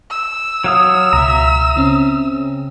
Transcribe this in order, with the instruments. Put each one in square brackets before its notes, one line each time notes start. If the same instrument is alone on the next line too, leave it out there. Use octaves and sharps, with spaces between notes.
[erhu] E6
[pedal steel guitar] F#3 F5 D#6
[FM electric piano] C#2 B2 [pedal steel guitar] E5 A#5
[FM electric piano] C#3 C4 C#4